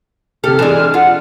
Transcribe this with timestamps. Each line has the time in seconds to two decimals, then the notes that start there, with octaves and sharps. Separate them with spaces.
0.44 C3 G4 A4 F6
0.59 E3 G#3 D4 E7
0.94 F4 F#5